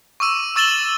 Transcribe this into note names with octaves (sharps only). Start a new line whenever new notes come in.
C#6 D6 E6 D#7
C#6 E6 A6 E7 F#7 G7